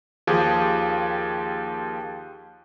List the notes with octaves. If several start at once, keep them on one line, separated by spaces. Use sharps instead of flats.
D#2 F3 G4 G#4